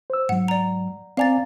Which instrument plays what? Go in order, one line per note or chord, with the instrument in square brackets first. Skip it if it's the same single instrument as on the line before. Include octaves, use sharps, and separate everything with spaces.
[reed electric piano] C5 E6
[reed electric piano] G#2 F#3 [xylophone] F#5
[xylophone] D5 A#5
[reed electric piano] C4 D5 G#5 [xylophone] F5 A#5 A6